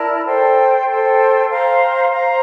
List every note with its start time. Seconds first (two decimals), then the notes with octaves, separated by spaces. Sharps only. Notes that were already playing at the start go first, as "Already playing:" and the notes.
Already playing: E4 A#4 D5 A5
0.25 A4 C5 G5
0.86 A4 C5 G5
1.48 C5 F5 A#5
2.09 C5 F5 A#5